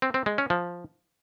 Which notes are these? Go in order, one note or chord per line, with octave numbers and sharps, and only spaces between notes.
C4
C4
G#3
C#4
F3